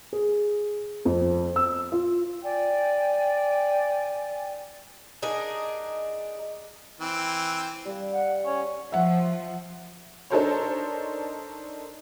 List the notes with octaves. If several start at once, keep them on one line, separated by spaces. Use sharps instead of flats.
G#4
F2
E6
F4
D5 G5 G#5
D4 D#4 G#4 A#4
E3 C4
G3 F5
F#5
C#4
F3 E5 F#5
D4 D#4 A4 A#4 C5 C#5